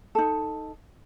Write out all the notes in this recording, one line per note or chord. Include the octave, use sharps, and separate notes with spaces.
D#4 A4